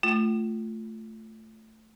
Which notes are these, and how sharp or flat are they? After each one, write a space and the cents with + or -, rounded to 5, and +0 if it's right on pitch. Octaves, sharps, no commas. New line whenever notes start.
A3 +0 F4 +0